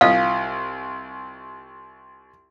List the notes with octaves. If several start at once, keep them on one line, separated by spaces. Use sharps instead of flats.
C2 F4 D#5 F5